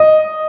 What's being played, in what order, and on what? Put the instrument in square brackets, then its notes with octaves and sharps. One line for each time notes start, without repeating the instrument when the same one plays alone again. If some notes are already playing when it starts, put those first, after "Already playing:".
Already playing: [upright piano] D#5